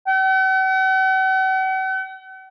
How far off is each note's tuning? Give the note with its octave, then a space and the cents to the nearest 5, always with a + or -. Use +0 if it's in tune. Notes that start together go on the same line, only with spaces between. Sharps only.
F#5 +45